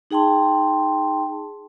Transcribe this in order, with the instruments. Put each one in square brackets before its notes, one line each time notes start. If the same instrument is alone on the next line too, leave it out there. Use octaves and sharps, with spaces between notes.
[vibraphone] D#4 G#4 G5 A5 C6